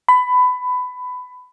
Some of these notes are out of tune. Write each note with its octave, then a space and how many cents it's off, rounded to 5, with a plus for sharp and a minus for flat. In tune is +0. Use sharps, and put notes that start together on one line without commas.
B5 +20